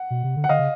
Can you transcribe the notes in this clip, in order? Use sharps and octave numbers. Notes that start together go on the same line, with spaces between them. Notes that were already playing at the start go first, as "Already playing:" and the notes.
Already playing: F#5
B2
C3
D3
F#5
D3 D#5 F5
C#3